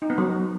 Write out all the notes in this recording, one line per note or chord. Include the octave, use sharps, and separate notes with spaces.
D#4
B3
F#3